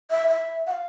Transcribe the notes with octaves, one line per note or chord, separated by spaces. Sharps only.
E5
E5
F#5
F5